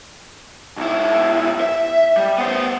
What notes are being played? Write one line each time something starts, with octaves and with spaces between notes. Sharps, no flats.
B1 E4
E5
G3
B3 C5